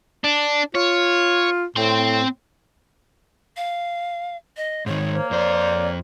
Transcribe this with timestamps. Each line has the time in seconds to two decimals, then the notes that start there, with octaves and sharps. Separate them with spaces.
0.24 D4
0.75 F4 C#5
1.76 A2 C4 C6
3.57 F5
4.57 D#5
4.86 G#2 D#3 C#5
5.14 A#3 C5
5.31 F2 C5 D5